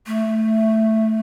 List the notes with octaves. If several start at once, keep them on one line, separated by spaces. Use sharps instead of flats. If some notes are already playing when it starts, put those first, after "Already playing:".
A3